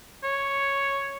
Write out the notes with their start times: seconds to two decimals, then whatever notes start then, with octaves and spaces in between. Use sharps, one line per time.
0.24 C#5